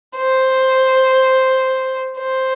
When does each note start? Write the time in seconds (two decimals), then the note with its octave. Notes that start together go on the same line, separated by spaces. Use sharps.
0.17 C5
2.18 C5